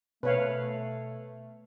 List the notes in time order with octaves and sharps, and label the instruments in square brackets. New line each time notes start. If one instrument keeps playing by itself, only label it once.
[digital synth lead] B2 [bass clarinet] A3 [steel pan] B4 C#5 F5